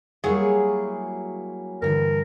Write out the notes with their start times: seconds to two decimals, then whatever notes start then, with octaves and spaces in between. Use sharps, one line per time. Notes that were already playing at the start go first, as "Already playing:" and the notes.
0.24 F#3 G3 A#3 E4 G#4 C#5
1.82 G2 D3 E3 A#4